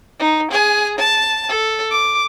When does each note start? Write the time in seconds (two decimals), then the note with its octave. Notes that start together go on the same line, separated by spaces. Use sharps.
0.20 D#4
0.52 G#4 G#5
0.98 A5
1.49 A4
1.91 D6